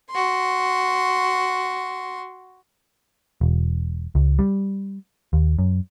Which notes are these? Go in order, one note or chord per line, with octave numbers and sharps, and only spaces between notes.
F#4 C6
E1
C#2
G3
D#2
F#2